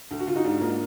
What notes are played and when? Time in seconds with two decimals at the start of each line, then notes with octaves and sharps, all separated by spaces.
0.11 D2
0.19 F#4
0.27 D3 F4
0.35 D#4 F#4
0.44 G#2 D4 F4
0.61 A#3